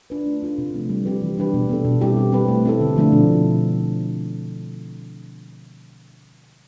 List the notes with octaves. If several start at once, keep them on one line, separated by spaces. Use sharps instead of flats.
D4 F4 B4
A3
D4 F4 A4
C3
F3 A3 C4
G3
C4 G4 B4
E3
G3 D4 G4 B4
B2
B3 D4 A4
B2
G3 C4 E4 G4
G3
C4 G4 B4
A3
C4 E4 A4
D3
F3 A3 D4 F4
B2